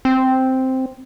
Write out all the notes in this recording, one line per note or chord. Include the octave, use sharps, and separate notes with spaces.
C4